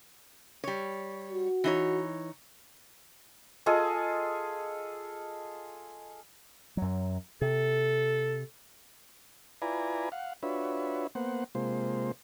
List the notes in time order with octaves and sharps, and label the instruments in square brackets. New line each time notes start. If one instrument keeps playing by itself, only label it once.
[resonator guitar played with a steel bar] G3 C#5
[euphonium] F#4
[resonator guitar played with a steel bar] E3 D#4 C#5
[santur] F4 G#4 A4 D#5
[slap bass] F#2 F#3
[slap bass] C3 [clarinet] A4
[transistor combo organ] E4 F4 B4 D5 G#5 A#5
F5 F#5
D4 F4 F#4 B4 C#5 E5
A#3 B3 C5 F#5
C3 G#3 A#3 F4 C5